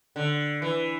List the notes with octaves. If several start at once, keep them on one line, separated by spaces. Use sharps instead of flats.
D3
E3